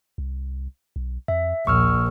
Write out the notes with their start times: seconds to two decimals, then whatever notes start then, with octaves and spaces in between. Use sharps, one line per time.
0.18 C2
0.96 B1
1.28 F2 E5
1.67 A#1 D#2 C#6 E6 F6